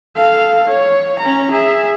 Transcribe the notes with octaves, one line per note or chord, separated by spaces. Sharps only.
A4 F5
C#5
C#4 A#5
G#4 E5